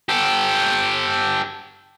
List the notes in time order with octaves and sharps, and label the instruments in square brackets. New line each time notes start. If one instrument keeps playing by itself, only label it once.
[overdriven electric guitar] G4 A4